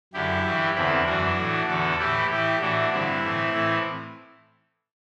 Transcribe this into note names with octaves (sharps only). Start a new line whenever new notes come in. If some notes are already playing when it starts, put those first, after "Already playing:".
F#2 D3 E4 G4
G2 E3
E2 D3 C4 E4
F#2 E3 D4 F#4
A2 E3
E2 D3 F#4 A4
A2 E3 E4 G4
A2 E3 E4 G4
A2 E3 D4 F#4
G2 D3 C4 E4
A2 E3
A2 E3